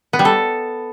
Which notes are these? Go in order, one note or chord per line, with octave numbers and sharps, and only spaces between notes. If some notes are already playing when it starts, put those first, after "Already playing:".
B3
G3
A4